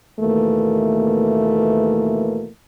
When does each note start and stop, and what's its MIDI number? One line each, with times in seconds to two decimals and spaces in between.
0.20 2.49 39
0.20 2.49 47
0.20 2.49 52
0.20 2.49 57
0.20 2.49 58